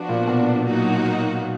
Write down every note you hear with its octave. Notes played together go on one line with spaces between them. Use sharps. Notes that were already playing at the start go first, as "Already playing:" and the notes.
Already playing: F3 B3 D4 F#4
A#2
B2
F#3 A#3 D#4 F#4